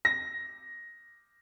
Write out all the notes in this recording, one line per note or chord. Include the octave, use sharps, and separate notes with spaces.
A#6